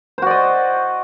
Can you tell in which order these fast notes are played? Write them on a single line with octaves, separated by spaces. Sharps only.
C5 F#4 D5 D#5